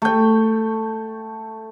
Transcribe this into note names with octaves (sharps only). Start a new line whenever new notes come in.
A3 G5